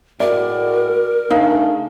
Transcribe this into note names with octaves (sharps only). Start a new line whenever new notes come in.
A2 G#3 F#4 A#4 D5
C#3 A3 D4 D#4 F5